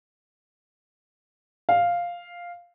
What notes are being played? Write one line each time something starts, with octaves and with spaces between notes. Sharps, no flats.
F5